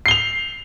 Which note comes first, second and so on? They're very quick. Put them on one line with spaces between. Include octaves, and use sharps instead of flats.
C7 G7 F7